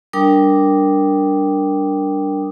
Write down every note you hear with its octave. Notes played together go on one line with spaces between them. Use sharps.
G3 D4 A#4 G5 D6 D#6